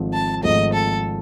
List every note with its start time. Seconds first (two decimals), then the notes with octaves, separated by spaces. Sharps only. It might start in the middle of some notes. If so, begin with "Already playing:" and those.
Already playing: G#1 G#2 F3 A3 C4
0.14 A5
0.43 G#1 G#2 F3 A3 C4 D#5
0.73 A4